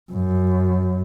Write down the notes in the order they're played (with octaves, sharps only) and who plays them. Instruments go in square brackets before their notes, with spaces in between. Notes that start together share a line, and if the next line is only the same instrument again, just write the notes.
[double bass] F#2